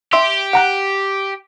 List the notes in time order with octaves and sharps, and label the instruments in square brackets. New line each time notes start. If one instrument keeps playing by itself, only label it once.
[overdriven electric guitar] G4 [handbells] E5 C6 E6
[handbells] F#5 A#5 F#6